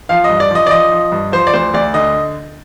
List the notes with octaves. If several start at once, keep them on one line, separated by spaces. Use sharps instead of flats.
F3 F5
D#5
G2
D5
F3 D#5
D5
F3 D#5
F3
G2
F3 C5
D5
D2 C5
D2 D5
D3 D#5